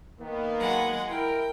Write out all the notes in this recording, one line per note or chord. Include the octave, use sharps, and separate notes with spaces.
D#3 A#3 B3
F#3 G#3 F#5
E4 A#4 G5